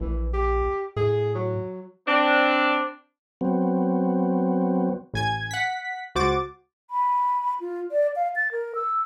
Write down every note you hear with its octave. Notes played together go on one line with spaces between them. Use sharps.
A#1 E3
G4
A2 G#4
F#3
C4 D4
F#3 B3 C4
A1 G#5 G#6
F#5 B6
C#2 F#4 C5 D6 A6
B5
F4
D5
F5
A6
A#4
E6